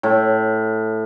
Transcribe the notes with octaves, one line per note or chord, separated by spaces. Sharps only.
A2